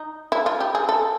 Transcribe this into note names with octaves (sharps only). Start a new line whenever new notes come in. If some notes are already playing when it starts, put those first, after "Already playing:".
Already playing: D#4
E4
F4
G4
G#4
A4